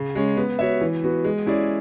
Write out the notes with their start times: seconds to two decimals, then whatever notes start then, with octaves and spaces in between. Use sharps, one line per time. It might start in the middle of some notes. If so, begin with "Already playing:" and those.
Already playing: C#3
0.15 G#3 C#4
0.37 B3
0.59 F#4 C#5 E5
0.81 E3
1.04 B3 F#4
1.24 G#3
1.46 C#4 E4 G#4 D5